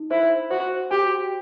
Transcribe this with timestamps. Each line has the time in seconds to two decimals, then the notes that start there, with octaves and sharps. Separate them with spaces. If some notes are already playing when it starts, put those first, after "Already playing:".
Already playing: D#4
0.11 E4 C5
0.51 F#4 C5
0.91 F#4 G4